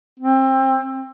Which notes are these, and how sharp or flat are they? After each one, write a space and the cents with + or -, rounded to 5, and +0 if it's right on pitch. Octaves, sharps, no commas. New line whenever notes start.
C4 +25